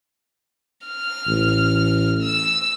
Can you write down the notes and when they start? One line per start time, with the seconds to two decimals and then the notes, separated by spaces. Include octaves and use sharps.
0.88 F6
1.27 A1
2.22 E6